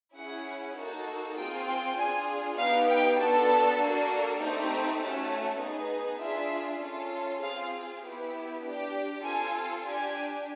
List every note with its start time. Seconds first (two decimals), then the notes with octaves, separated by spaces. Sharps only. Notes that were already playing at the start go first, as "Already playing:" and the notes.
0.16 C#4 E4 G#4 F#5
0.77 A#3 D#4 F#4 A4
1.37 C4 F4 G#4 G5
1.68 G5
1.97 D4 F4 G#4 G#5
2.58 B3 D#4 G4 F5
2.88 G5
3.18 B3 D4 F#4 A4 A5
3.79 A#3 D4 F#4 A4
4.40 A3 C4 D#4 G4
5.00 A3 C#4 F#4 A5
5.61 B3 D#4 G#4
6.21 D4 F4 G#4 E5
6.81 C#4 F4 A4
7.42 C4 F4 G#4 F5
8.03 B3 E4 G4
8.63 D4 G4
9.24 C4 F4 A4 G#5
9.84 D4 G4 G#5